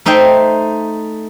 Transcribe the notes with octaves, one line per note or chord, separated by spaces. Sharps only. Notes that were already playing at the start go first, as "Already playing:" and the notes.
A3 D#4 C5 E5 G5